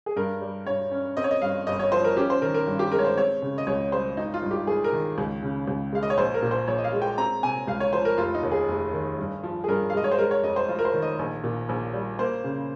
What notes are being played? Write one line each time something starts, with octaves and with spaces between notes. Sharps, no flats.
G#4
G2 A#4
G3
G2 C#5
C#4
C4 D#5
C#5
D#5
G2 F5
G1 D#5
C#5
F3 C5
A#4
C#4 G4
C5
D#3 A#4
A#4
G2
G4
G#3 A#4
C#5
C5
C4 C#5
C#3
D#5
C#2 C#5
G3 C5
G#1 D#4
F4
G2
G4
G#1 G#4
A#4
D#3
C#2
C#3
C#2
G#3 F5
D#5
C#5
A#1 C5
A#4
A#2
C5
A#1 C#5
D#5
F5
G#3
G5
C4 A#5
C3 G#5
C#2 F5
C#5
F3 C5
A#4
F1 F4
D#4
D#2
G#4
F1
D#3
G2
F3
G#4
G2 A#4
F5
G#3 D#5
C#5
C5
G#3 A#4
C#5
F2 D#5
C5
F1 F4
A#4
C5
D#3
D#5
A#1
A#2
A#1
G3
A#3 C5
C#3